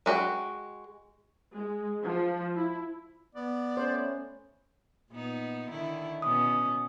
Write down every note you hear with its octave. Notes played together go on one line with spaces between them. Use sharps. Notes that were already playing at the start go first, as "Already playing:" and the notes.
G#3 F#4 B4 G5
G#3
F3
E4
B3 D5
A3 C#4 C5
A#2 B3 D#4
D3 D#3 E4
B2 B3 C#4 D#6